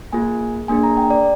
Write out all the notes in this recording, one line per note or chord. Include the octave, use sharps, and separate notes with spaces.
A#3 F4 G#4 G#5
A#3 D4 G#4 G#5
A#5
G5
D5